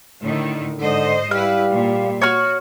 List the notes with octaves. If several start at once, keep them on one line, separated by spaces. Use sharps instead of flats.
A2 D3 D#3
G#2 D3 C5 D#5
G3 E4 B4 F5
A#2
F#4 C#5 C#6 F6